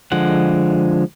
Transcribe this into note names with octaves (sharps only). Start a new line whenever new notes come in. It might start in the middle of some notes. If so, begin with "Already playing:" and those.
D3 F3 G#3 F#5